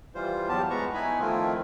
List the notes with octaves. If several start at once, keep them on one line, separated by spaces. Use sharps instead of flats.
E3 G3 F4 C5
E2 F#3 B3 G4 A5
G#3 B3 B4 A#5 C#6
B3 D#4 E4 B4 G#5 B5
D#3 F3 A3 C4 E4 F4